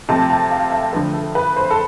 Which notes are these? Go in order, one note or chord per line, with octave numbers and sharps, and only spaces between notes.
C3 F3 A3 A5
A5
F5
E5
D3 F3 A3 B4
A4
B4
C5
A4